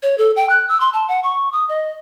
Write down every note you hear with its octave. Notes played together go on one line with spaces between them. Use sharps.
C#5
A4
G5
F#6
E6
C6
A5
F#5
C#6
D#6
D#5